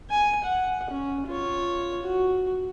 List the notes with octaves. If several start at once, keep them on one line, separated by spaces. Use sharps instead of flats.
G#5
F#5
C#4
F4 C#5
F#4